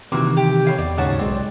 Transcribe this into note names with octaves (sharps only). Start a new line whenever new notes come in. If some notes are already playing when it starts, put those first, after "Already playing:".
C3 D#3 E3 A#3 F#4
G4
A2 F5 G#5
E2 D5
D#2 G#2 C#3 C#4 F#4 A5
B1 G#3 C4 D5